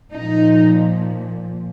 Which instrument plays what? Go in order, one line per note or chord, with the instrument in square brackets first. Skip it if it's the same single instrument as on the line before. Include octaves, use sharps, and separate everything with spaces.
[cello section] A#2 F3 D#4